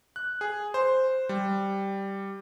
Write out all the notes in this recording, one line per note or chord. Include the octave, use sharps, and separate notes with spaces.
F#6
G#4
C5
G3